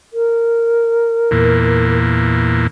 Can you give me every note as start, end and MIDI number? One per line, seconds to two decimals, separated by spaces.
0.13 1.97 70
1.31 2.67 40
1.31 2.67 46